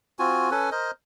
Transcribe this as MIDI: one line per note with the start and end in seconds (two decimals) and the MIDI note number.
0.19 0.50 60
0.19 0.50 65
0.19 0.50 66
0.19 0.50 80
0.51 0.70 61
0.51 0.70 69
0.51 0.70 71
0.51 0.70 80
0.72 0.91 70
0.72 0.91 72
0.72 0.91 75